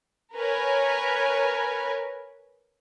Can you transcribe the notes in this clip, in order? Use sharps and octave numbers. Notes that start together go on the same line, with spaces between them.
A#4 B4 C#5 G#5